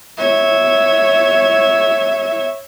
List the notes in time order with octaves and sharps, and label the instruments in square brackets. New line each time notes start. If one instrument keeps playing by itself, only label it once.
[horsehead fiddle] C#5 E5